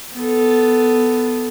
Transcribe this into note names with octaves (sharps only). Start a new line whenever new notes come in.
B3 A4